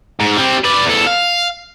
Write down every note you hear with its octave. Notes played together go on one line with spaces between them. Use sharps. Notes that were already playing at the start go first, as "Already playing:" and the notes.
G#2
G3 C4
B4 D5
E2 A4
F5